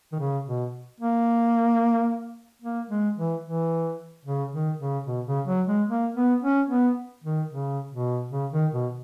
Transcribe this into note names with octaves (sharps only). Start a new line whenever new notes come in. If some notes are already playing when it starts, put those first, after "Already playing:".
D#3
C#3
B2
A#3
A#3
G#3
E3
E3
C#3
D#3
C#3
B2
C#3
F#3
G#3
A#3
B3
C#4
B3
D#3
C#3
B2
C#3
D#3
B2